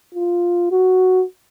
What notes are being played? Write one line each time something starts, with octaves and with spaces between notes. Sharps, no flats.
F4
F#4